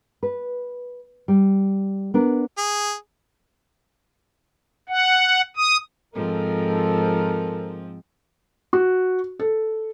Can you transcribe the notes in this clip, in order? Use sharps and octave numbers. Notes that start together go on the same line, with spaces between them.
B4
G3
B3 D4 A#4
G#4
F#5
D#6
G#2 F3 C4 A4 A#4
F#4
A4